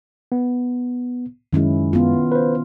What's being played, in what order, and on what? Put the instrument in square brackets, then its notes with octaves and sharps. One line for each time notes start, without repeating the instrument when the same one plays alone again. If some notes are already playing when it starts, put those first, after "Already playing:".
[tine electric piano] B3
[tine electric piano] F#2 G#3 [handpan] D#3 C#4 E4
[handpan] B3 F4
[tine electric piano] B4 C5